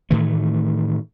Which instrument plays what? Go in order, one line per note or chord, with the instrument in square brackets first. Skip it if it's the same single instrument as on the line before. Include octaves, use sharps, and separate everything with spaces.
[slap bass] A2 D#3 E3 A3